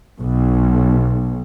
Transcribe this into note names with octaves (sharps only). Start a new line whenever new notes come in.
B1